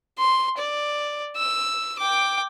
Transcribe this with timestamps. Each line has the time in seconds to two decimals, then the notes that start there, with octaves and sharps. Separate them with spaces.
0.19 C6
0.58 D5
1.37 E6
1.99 G5 D6